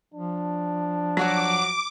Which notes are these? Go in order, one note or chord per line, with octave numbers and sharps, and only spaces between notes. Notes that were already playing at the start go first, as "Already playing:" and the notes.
F3 D4
F#3 F#4 F#5 D6